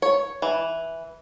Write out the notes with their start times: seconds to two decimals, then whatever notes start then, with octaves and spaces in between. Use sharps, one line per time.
0.02 C#5
0.42 E3